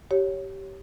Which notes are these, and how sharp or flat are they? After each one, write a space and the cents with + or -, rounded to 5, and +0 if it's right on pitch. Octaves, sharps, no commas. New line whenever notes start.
G4 -15 C#5 +0